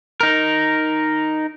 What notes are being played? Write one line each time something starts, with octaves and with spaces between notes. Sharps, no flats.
D#4 A#4